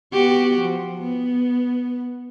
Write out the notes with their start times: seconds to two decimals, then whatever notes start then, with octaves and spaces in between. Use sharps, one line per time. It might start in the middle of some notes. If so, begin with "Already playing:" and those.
0.13 B3 F#4 G4
0.60 F3
1.00 B3